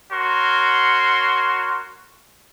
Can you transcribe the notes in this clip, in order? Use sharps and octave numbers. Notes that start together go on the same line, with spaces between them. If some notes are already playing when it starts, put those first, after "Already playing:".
F#4 A#4 C#5 C6